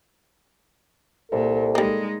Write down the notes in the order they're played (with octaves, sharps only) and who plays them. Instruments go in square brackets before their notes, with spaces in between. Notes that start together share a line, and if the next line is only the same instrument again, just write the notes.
[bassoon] C2 [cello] A#2 [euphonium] A4
[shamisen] G3 A#3 [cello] G#3 D#4